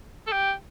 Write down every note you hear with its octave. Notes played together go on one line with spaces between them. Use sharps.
A4
G4